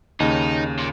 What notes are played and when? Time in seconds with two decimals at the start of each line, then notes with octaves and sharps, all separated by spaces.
0.20 D#2 C#3 D#4
0.79 A#2